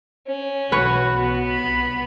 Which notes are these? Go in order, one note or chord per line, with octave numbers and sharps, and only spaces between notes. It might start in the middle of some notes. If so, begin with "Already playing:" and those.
C#4
B1 E3 F#4 B4 C#5
B2 B3
C2 B5